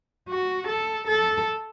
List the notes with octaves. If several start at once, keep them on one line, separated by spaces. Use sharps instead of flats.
F#4
A4
A4